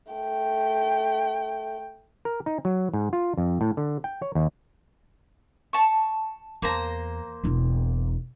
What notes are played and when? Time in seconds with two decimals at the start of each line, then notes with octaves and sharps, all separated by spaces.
0.12 A3 G5
2.25 A#4
2.46 D#4
2.65 F#3
2.94 G#2
3.13 F4
3.37 F2
3.61 A2
3.77 D3
4.04 G5
4.22 C#5
4.35 D#2
5.73 A5 C#6
6.62 E2 A#3 C5 A#5
7.44 E1 E4